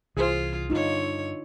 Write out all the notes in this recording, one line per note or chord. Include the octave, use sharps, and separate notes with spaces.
C2 E3 F4 G#4 C5
G2 D3 D#4 F4 C#5